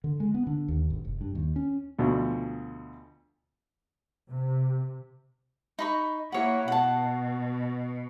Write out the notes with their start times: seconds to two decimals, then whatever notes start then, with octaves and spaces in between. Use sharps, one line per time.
0.04 D3
0.20 G#3
0.34 B3
0.47 D3
0.68 D#2
0.90 G#1
1.05 F1
1.21 G2
1.35 D#2
1.56 C#4
1.99 D2 B2 F3
4.30 C3
5.79 D#4 B5 C#6
6.32 A#3 E4 C#5 F#5
6.68 B2 F#5 A5